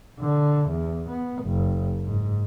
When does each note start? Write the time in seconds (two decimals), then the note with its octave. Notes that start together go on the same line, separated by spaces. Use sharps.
0.20 D3
0.70 E2
1.10 B3
1.43 F#1
2.05 G#2